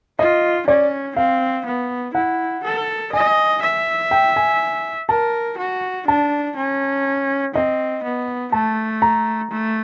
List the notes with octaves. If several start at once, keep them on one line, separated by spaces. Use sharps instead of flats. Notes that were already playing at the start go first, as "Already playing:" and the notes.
F4 D#5
C#4 D5
C4 F5
B3
E4 F#5
A4
D#5 G#5
E5
G5
G#5
A#4 A5
F#4
D4 A5
C#4
C4 D#5
B3
A3 A5
A#5
A3